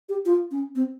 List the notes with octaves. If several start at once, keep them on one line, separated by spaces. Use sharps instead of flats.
G4
F4
C#4
C4